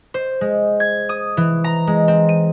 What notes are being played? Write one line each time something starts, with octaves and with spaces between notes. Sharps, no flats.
C5
G#3
G#6
D#6
E3
A#5
G#3
C4
D#7